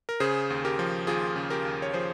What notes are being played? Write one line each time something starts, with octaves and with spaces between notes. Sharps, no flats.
A#4
C#3 G#4 C5
D#2
G4 A#4
F3
D#2 F4 G#4
C#3
G4 A#4
D#2
C#5
F3 G#4 C5